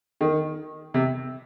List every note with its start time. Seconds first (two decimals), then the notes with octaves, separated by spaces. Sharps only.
0.21 D#3
0.94 C3